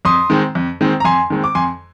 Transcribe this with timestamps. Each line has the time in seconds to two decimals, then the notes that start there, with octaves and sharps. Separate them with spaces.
0.05 F2 C6 D#6
0.30 D#3 G#3 C4
0.55 F2
0.81 D#3 G#3 C4
1.00 A#5
1.05 F2 G#5 C6
1.30 D#3 G#3 C4
1.44 D6
1.55 F2 G#5 C6